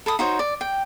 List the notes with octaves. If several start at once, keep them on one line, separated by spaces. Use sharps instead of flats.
A4 B5 D#6
D#4 F#4 C5 C#5
D5
G5